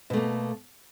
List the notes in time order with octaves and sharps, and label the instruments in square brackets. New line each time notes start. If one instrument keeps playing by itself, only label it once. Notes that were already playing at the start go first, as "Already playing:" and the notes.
[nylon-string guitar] B2
A3
A#3